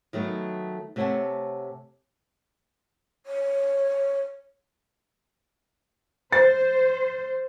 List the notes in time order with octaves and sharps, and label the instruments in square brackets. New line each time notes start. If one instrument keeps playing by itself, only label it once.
[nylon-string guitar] D#3 F#3 A3 B3
C3 A3 C#5 F#5 G#5 A5
[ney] C#5
[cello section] C5 [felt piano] A6